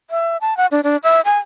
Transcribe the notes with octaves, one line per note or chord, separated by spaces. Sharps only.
E5
A5
F#5
D4
D4
E5
G#5